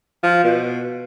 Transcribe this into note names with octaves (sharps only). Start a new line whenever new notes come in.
F3
B2